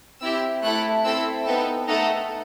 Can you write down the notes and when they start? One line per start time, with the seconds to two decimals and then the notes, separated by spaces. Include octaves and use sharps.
0.21 C4 E4 G4 E6
0.62 A3 E4 A4 F#6
1.04 C4 E4 A4 E6
1.45 B3 D#4 A4 G5
1.87 A3 D#4 A4 F#5